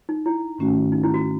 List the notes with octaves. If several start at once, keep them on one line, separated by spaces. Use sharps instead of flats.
D#4
E4
G#2 D#3 A3 C#4 F#4
D#4
E4
F#4